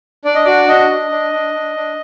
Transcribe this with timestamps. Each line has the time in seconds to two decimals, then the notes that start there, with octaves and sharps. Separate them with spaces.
0.25 D4 D5
0.35 D#5
0.45 F#4 D5
0.68 D4 D#5
0.90 D4
1.11 D4
1.33 D4
1.54 D4
1.76 D4